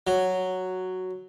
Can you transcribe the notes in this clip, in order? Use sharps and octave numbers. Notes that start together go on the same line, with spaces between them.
F#3